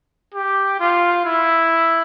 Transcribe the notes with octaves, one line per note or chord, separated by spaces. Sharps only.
G4
F4
E4